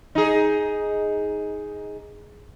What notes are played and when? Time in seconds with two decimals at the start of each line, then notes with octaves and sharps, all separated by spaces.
0.15 D#4 G#4